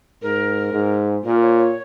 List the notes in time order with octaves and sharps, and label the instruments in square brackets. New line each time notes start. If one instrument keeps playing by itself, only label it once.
[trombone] G#2 [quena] A#4
[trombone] G#2
[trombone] A#2 [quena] A#4
[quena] C#5
C#5